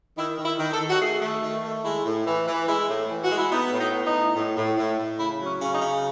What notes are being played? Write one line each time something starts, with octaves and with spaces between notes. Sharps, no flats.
D#3 E4
D#3
E4
D#3
A4
D#3
F#4
A3 G#4
A3
D#3
A3
G#3 E4
A2
E3
E3
G#3 E4
A2
E3
F#4
G#3
E4
B3 D#4
A2
D#4
B3
D#4
A2
A2
A2
A2
A2
C#3 E4
F#3
C#4
C#3 C#4
D#4
C#3